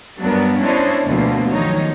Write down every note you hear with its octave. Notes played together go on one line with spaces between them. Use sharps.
G2 F#3 B3 D4 A#4
C#4 D4 E4 C5 C#5 D#5
D2 B2 F3 A#3
D#3 F3 F#3 D#4 C#5